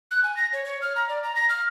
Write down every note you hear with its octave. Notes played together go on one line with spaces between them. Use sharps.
F#6
G#5
A#6
C#5
C#5
F6
A#5
D5
A#5
A#6
F6